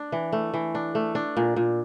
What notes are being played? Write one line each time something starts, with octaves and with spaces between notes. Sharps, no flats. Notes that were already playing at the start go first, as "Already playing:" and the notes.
Already playing: D4
E3
A3
E3
D4
A3
D4
A#2
A#2